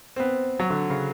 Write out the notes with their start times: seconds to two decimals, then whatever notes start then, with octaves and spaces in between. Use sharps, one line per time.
0.16 C4
0.20 B3
0.60 F#3
0.70 D3
0.90 C#3